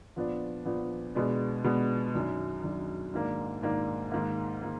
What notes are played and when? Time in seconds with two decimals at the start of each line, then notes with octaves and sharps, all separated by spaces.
0.16 A#2 F3 B3 D4
0.65 A#2 F3 B3 D4
1.15 B2 G#3 B3 D4
1.64 B2 G#3 B3 D4
2.14 F#2 D#3 F#3 D4
2.63 F#2 D#3 F#3 D4
3.13 G#2 D#3 A#3 D4
3.62 G#2 D#3 A#3 D4
4.12 G#2 D#3 A#3
4.62 D#3 A#3